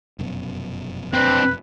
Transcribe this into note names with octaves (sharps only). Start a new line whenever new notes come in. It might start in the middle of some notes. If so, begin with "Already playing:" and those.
F1 F#2 B2
C4 D4 B4